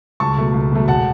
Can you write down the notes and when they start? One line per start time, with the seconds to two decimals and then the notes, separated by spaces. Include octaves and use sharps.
0.20 C#2 A5 C#6
0.37 B2 F#3 A3
0.54 C#2
0.71 B2 F#3 A3
0.88 E1 F#5 A5